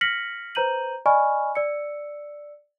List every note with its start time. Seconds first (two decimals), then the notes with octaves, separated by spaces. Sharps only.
0.01 F6 A#6 B6 C#7 F#7
0.55 B4 C5 A#5 G6 D#7 F#7
1.06 D5 D#5 G#5 B5 C#6 F6
1.55 D5 E6 C#7